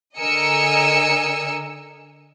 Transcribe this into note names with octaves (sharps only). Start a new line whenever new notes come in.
D3 A#4 D#5 G#5 E6 C#7